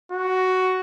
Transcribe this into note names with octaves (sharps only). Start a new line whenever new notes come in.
F#4